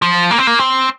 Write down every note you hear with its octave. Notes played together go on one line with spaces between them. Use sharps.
F3
A#3
C4
A#3
C4